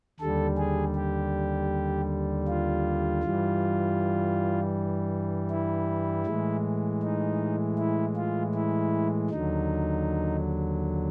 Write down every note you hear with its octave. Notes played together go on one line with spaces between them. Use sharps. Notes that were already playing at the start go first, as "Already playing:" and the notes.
D#2 D3 G3 A4
G#4
G4
F4
G2 E3 G3
E4
A2 E3 G#3
D#4
E4
F4
E4
D#2 D3 F#3 D#4